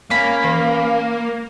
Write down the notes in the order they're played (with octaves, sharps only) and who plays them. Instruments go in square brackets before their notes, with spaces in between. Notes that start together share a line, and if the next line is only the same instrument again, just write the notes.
[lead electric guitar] A#3 [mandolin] C#4 B5 [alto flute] F5
[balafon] E3